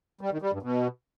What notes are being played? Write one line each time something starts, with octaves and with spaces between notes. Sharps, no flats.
G3
D#3
G3
G2
B2